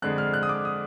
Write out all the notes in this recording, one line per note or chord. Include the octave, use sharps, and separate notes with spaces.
F2 D3 G#3 D4 F#6
F6
F#6
D#6
D6
D#6